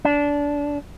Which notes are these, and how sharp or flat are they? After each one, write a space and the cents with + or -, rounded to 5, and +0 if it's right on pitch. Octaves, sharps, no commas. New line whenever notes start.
D4 -20